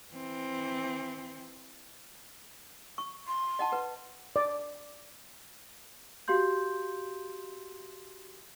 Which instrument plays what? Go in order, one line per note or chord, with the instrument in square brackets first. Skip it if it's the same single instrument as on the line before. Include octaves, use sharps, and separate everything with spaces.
[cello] E3 C4
[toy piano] C#6
[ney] C6
[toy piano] D#5 F#5 A5
B4 F#5
[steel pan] D5
[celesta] F#4 G4 F5 C6 G6